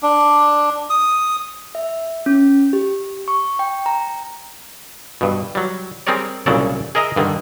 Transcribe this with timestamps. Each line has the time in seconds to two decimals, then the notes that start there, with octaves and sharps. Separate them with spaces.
0.03 D4
0.90 D#6
1.75 E5
2.26 C#4
2.73 G4
3.28 C#6
3.59 G5
3.86 A#5
5.21 G2 B2
5.55 F#3 G3
6.07 G3 C4 G#4 A#4 C#5 D5
6.46 C2 A#2 C#3 F#3 A4 D5
6.95 G#4 A#4 D#5 E5 A#5
7.16 G2 D3 D#3